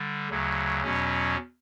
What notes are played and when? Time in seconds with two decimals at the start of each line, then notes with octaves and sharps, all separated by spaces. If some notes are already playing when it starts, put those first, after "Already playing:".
Already playing: D3 G3
0.29 D2 C#3 F#3
0.83 E2 B2 F#3 C#4